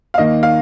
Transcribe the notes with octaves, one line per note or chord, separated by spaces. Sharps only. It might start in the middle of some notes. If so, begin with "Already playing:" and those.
F5
D#2 D#3 A#3 D#5
F5